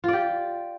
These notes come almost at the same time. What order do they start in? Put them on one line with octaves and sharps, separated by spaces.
F4 D5 G4